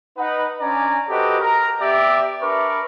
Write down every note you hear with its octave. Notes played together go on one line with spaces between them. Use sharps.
D#4 B4 F#5
C#4 D4 D5 G#5 A#5
F#4 G4 A4 B4 C5 D#5
A#4 A#5
B3 G4 D5 E5
D4 A#4 B4 E5 C#6 D6